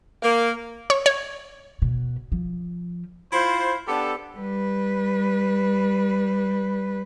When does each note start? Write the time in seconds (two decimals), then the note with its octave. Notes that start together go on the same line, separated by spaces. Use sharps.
0.23 A#3
0.90 C#5
1.06 C#5
1.82 B2
2.32 F3
3.32 E4 F4 C5
3.87 B3 D4 G4 A4
4.37 G3 B4